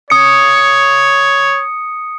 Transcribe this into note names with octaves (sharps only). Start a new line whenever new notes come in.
C#5 D#6 C#7